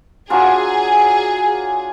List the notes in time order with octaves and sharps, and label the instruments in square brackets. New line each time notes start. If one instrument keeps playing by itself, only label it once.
[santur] F#3 D4 F4 [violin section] G#4